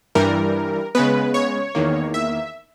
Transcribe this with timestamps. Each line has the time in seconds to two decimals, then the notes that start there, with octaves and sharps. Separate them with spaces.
0.15 G2 E3 G3 A#4
0.95 C#3 G#3 B3 B4
1.34 C#5
1.75 E2 D#3 A#3
2.14 E5